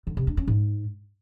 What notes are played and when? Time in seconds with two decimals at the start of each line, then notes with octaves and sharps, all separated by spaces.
0.07 D3
0.17 C3
0.27 D4
0.37 C#4
0.47 G#2